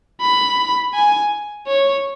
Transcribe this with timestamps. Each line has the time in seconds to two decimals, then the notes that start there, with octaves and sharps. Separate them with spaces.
0.21 B5
0.94 G#5
1.67 C#5